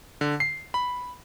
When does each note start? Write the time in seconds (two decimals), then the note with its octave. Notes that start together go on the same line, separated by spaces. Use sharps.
0.21 D3
0.40 C7
0.74 B5